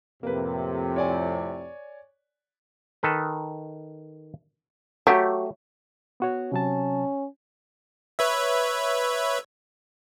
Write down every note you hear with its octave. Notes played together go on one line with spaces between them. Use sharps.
F2 A2 C3 A#3 B4
C#5 D5 G#5
D#3 A4 B4
F#3 A3 G4
B3 F#4 C#5
C3 F#3 C#4 A5
B4 C#5 E5